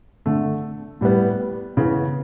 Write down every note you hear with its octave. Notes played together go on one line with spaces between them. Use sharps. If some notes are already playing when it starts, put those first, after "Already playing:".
D3 A3
A2 G3 B3
C#3 E3 B3